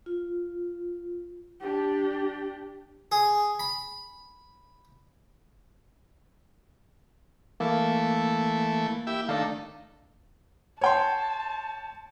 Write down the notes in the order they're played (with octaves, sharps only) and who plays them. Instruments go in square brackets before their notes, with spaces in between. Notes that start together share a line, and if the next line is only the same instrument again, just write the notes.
[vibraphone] F4
[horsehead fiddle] D4 G4
[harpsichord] G#4
B5
[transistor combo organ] E3 A3 [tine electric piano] A#3
[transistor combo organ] E4 G4 E5
[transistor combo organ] D#3 A3 [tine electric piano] D4 D5 F5
[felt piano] C#5 G5 C6 [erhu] A5